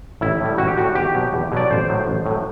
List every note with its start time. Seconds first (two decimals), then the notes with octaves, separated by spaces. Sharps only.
0.21 A1 E4
0.40 A2 G3
0.58 A1 F#4
0.68 G4
0.77 A2 G3 F#4
0.95 E2 G4
1.15 B2 F#3
1.33 E2
1.52 B2 F#3 D5
1.70 A1 C5
1.89 A2 F#3
2.08 A1
2.26 A2 F#3